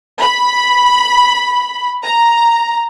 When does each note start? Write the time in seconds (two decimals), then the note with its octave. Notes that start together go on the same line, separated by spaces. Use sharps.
0.20 B5
2.04 A#5